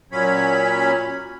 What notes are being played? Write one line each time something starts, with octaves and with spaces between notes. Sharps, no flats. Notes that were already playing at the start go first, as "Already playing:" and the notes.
A#2 F#3 C#4 C#5 B5